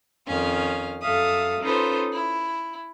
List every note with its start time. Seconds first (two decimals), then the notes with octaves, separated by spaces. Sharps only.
0.27 F2 D#3 C#4 F5
1.02 F#2 A4 E5 F5 D#6
1.62 C#4 D#4 F4 A4 B4 C5
2.13 E4